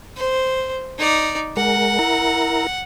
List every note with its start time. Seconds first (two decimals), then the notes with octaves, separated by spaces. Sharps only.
0.17 C5
0.98 D#4 D5
1.57 G#3 A#4 F#5
1.99 E4 A#4 A#5